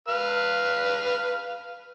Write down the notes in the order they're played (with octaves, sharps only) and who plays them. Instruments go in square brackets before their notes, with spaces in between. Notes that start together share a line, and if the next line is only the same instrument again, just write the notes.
[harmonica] B4 F5 F6